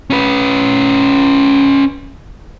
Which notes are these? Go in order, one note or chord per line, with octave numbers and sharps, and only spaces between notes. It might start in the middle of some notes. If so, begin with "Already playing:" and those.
C#4 B4